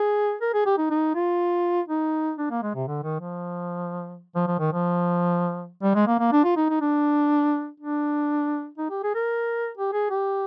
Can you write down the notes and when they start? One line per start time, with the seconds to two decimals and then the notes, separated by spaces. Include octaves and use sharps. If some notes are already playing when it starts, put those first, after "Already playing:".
Already playing: G#4
0.41 A#4
0.54 G#4
0.66 G4
0.78 D#4
0.91 D#4
1.15 F4
1.88 D#4
2.38 D4
2.51 A#3
2.62 G#3
2.75 C3
2.87 D3
3.04 D#3
3.20 F3
4.35 F3
4.47 F3
4.59 D#3
4.72 F3
5.83 G3
5.95 G#3
6.07 A#3
6.20 A#3
6.32 D4
6.44 F4
6.56 D#4
6.70 D#4
6.81 D4
7.80 D4
8.78 D#4
8.90 G4
9.03 G#4
9.15 A#4
9.77 G4
9.93 G#4
10.10 G4